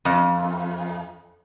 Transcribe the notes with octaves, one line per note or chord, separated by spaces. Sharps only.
F2